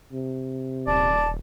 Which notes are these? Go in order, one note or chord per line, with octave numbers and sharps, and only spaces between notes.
C3
D#1 D5 A5